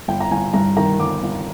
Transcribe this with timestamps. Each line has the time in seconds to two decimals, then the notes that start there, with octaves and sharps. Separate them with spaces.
0.08 G1 G5
0.20 A#5
0.31 G1 G#5
0.54 G2 A#5
0.77 D#3 A#5
1.00 G1 D6
1.23 G1